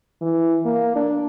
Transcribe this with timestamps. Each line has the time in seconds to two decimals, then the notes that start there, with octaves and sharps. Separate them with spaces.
0.21 E3
0.65 A#3
0.95 D4